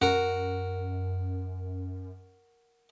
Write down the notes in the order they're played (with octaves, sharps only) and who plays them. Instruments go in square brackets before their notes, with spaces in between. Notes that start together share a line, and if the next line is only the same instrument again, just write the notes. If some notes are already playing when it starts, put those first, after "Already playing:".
[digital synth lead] F#2 [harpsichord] F#4 A#4